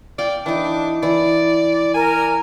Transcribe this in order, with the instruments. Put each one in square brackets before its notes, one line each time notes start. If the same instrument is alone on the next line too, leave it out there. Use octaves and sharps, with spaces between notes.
[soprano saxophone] D5 [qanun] F5 G5
[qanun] E3 D#4 [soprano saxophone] D4
[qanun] E3 [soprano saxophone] D5
[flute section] A#4 [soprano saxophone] G#5